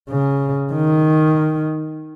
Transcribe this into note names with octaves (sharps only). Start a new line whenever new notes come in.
C#3
D#3